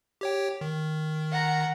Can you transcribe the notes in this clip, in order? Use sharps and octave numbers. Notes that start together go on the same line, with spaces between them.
G4 C#5 G5
D#3
F#5 A#5